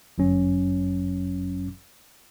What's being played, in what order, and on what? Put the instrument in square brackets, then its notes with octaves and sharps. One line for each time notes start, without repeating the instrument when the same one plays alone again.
[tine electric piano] G1 F#2 F#3 C#4